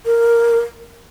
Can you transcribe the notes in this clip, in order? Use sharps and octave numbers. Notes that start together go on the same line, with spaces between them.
A#4